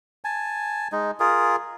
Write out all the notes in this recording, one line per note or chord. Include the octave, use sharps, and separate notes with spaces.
G#5 A5
G#3 D#4
F4 G#4 A#4